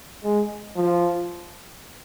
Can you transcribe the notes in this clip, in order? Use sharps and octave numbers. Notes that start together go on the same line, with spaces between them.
G#3
F3